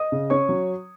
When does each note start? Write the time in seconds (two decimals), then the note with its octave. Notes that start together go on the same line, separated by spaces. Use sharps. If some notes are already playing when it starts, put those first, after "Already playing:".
Already playing: D#5 D#6
0.12 C#3
0.30 C#4 C#5 C#6
0.49 F#3